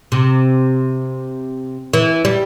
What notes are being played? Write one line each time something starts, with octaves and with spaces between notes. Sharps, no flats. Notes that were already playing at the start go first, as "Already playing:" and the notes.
C3
E3
G3